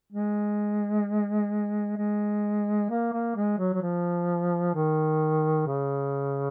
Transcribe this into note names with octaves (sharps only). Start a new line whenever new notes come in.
G#3
G#3
A#3
A#3
G#3
F#3
F#3
F3
D#3
C#3